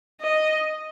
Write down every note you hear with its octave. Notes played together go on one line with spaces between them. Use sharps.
D#5